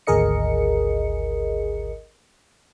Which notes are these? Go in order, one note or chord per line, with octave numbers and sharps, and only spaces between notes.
G#1 D2 G#4 A#4 D#5 C#7